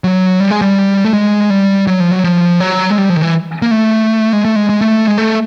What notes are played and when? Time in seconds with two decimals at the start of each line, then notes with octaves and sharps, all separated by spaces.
0.04 F#3
0.40 G3
0.51 G#3
0.62 G3
1.04 A3
1.13 G#3
1.50 G3
1.87 F#3
2.00 F3
2.11 F#3
2.24 F3
2.60 F#3
2.90 G#3
2.98 G3
3.10 F3
3.17 D#3
3.22 E3
3.62 A#3
3.71 A3
4.33 G#3
4.45 A3
4.56 G#3
4.70 G#3
4.81 A3
5.07 G#3
5.18 A3